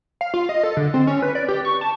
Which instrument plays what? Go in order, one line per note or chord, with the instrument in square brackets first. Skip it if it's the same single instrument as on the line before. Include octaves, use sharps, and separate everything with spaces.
[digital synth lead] F5
F4
D#5
A4
D3
C4
C#4
B4
D5
G4
C#6
A5